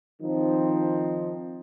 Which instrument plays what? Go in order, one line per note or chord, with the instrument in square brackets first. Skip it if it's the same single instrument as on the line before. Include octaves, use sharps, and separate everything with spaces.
[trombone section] D#3 F3 C4 D#4